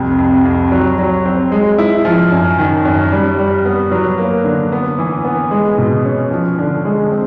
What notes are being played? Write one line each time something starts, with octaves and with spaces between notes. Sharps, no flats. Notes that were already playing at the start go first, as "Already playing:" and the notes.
Already playing: C2 F2
F2
F2
F#3
F#3
C4
G#3
E4
F3
F#2
D#3
F#2
G3
G3
B3
F#3
A#3
D3
B3
E3
B3
G#3
B2
C#4
F3
D3
G#3
C4